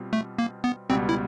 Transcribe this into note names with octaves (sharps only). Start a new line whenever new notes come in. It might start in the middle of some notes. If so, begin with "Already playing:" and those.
Already playing: B2 G3 C4 F4
A3
A#3
B3
C#2 B2 G3 B3 C4
E4